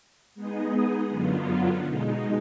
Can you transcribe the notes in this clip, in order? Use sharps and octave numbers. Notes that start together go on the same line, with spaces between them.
G#3 B3 D#4 G#4 D#5
F#2 D3 F#3 B3 F4
B2 G#3 D#4